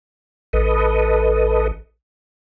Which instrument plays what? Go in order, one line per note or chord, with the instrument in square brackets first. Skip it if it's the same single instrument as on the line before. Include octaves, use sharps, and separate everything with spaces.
[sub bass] A1 [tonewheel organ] A4 B4 D#5